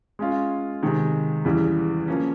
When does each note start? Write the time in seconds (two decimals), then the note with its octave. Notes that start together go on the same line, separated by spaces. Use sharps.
0.19 G#3 C#4 F4
0.83 C3 D#3 G#3
1.45 E2 C#3 E3 G3
2.08 F3 A#3 C#4